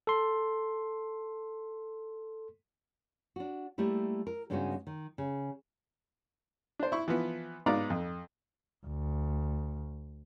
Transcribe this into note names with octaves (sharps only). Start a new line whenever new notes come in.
A4 C6
D4 F#4
G3 A3 A#3 E4 G4
A#4
G2 C#3 G#3 B3 D#4 F#4
D#3
C#3
D4 C5
E4 C#6
E3 F3 B3
G#2 B3 D#4 D5 F5 A#5
F2
D2